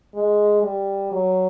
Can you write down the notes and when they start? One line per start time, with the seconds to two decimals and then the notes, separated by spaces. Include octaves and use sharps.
0.15 G#3
0.63 G3
1.12 F#3